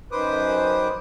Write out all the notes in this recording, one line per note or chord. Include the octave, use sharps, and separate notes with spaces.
F#2 D#3 B4 C5 D6 D#6